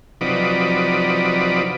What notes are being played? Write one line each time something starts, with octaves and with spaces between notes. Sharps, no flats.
C3 F3 F#3 D#4 B4 D5